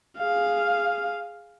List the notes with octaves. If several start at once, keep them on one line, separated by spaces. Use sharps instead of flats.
G#4 F5